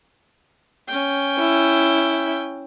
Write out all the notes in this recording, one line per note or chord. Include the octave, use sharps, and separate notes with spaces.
C#4 G5
E4